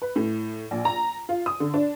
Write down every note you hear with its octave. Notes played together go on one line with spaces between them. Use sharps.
B4
A2
A#1
A#5
F4
D#6
D3
D4